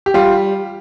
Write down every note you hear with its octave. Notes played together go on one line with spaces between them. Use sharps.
G4
G3 F4